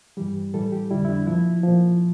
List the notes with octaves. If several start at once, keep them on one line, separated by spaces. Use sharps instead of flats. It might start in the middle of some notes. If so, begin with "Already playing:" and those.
G2 E3 G3 G4
A2 E3 G3 A4
G4
F2 D3 G3 E4
E4
D4
A#2 F3 E4
A#2 F3